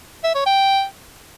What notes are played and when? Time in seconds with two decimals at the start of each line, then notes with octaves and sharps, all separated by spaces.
0.24 E5
0.35 C#5
0.46 G5